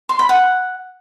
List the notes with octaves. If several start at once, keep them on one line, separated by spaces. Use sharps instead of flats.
C6
B5
F#5